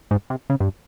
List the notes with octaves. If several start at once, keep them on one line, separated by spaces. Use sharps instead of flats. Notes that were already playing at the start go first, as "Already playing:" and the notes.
G#2
C3
C#3
G2